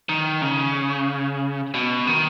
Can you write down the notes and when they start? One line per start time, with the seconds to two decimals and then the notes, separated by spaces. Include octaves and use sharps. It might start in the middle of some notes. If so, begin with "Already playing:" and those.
0.09 D#3
0.42 C#3
1.74 B2
2.07 D#3